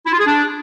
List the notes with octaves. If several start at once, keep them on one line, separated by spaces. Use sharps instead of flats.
E4
F4
G#4
D4